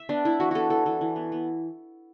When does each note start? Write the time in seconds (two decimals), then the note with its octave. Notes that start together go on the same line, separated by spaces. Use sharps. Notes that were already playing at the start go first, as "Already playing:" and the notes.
Already playing: E5
0.09 B3 D4
0.25 B3 E4
0.40 E3 F#4
0.51 B3 F#4 A4
0.70 E3 A4
0.86 E3 A4
1.01 E3
1.16 B3
1.32 B3